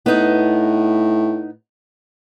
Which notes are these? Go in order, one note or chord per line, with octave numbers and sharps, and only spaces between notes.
A2 B3 D#4